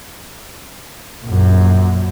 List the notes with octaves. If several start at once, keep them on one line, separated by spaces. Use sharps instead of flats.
A#1 F#2